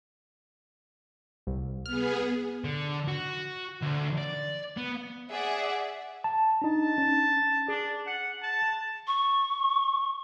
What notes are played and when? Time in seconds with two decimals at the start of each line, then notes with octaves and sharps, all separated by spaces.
1.47 C2
1.86 B3 G#4 F6
2.64 D3
3.08 F#4
3.82 D2
4.18 D5
4.77 B3
5.31 G#4 D5 E5 F#5
6.24 A5
6.62 D4 D#4 A5
6.98 C#4
7.68 D4 G#4
8.07 F#5
8.43 A5
9.07 C#6